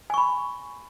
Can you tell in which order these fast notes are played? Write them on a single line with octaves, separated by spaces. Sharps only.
G#5 C#6 B5